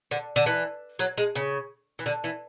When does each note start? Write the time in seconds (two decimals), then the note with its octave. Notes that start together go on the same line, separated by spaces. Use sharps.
0.11 D3
0.36 D3
0.46 E3
0.99 F#3
1.18 G#3
1.35 C#3
1.99 E3
2.06 D3
2.24 E3